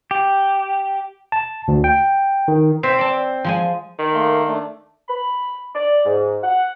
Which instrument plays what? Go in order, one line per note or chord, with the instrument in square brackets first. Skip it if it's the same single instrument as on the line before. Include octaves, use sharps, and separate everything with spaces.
[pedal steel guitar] G4
[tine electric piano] A5
D2
G5
D#3
[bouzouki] C4 [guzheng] E5
[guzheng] D5 A5
F3 G#3 G#5
[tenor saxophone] D#3
[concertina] A3 A#3 C6
A3 D4
[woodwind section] B5
D5
G#2
F#5